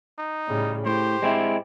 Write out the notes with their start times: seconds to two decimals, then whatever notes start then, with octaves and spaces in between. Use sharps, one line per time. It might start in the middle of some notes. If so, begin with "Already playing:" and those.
0.19 D#4
0.48 A2 C#3 G3
0.86 A2 G4 C5
1.22 G#3 C4 E4